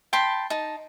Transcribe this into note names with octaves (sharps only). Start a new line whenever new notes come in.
G5 A5 B5 C6
D#4 A5